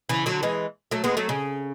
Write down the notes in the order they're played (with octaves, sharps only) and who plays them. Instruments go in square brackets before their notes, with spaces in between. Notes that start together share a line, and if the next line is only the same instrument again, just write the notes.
[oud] C#3 E3
D3 F#3
E3 G#3
F#3 A3
G#3 B3
F#3 A3
C#3